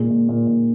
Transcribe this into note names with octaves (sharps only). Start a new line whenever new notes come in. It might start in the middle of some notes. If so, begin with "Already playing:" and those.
Already playing: A#2 G#3
A#2
A#2
A#2